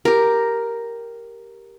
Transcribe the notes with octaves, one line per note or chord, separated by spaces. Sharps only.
G4 A#4